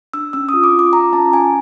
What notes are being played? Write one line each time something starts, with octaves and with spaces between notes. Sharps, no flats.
D4 E6
C#4 E6
D#6
F4
D6
F4
D6
F4 A#5
C#4 A5
C#4 G#5